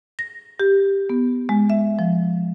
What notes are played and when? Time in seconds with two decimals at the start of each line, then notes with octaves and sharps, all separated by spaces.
0.19 A#6
0.60 G4
1.09 B3
1.49 G#3
1.70 E5
1.99 F3